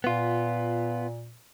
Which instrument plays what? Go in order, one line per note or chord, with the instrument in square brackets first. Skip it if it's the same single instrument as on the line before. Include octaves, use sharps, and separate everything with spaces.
[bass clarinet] A#2 [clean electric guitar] B3 F4